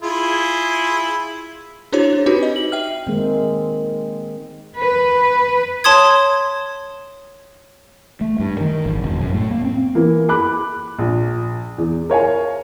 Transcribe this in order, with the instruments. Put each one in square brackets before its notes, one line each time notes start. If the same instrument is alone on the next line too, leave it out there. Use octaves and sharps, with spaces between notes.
[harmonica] E4 F4 G#4
[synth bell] D4 E4 F#4 G#4 C5 C#5
D4
C4 D#4 F#4 G4 B4
D#5
F#7
E5 G5 F6
[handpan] D#3 G#3 A#3 C4
[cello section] B4
[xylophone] C#5 A5 C6 D#6 G#6
[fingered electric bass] A3
G2
D#3
G#1
E1
F#2
A2
A#3
C4
[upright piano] E3 A#3
B5 D6 F#6
A#1
E2
A#4 C#5 F5 G#5